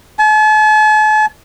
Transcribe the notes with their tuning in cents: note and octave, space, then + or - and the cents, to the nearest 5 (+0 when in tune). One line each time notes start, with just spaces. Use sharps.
A5 -45